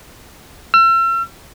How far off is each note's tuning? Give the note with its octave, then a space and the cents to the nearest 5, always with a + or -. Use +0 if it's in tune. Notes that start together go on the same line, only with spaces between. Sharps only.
E6 +40